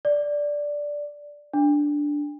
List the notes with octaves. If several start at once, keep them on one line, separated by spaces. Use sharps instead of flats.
D5
D4